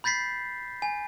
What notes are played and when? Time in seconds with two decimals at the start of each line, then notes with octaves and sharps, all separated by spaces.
0.04 B5 G6 A6 B6 C7
0.82 G#5